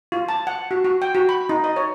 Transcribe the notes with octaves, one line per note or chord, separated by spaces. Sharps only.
F4
A5
F#5
F#4
F#4
G5
F#4
B5
D#4
D#5
C#5